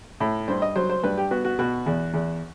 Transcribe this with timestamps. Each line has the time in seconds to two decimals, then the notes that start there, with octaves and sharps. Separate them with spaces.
0.20 A2
0.48 G2 C5
0.62 D#5
0.76 F#3 C5
0.90 C5
1.03 G2 B4
1.17 G4
1.31 B3 F#4
1.45 F#4
1.59 B2 F#4
1.86 E2
2.14 E2